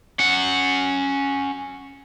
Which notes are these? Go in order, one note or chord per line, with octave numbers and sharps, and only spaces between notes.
C#4 F#5